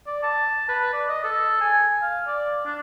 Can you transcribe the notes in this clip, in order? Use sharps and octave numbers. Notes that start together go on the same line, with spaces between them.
D5
A5
B4
D5
D#5
A4
G#5
F5
D5
D4